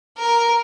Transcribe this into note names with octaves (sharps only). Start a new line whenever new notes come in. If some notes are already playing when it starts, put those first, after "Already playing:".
A#4